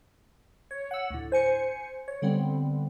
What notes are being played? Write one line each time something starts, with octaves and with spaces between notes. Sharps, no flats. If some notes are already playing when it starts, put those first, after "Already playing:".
C#5
F#5 E6
D2 A2
C5 G#5 C#7
C#5
D3 G3 B3 C4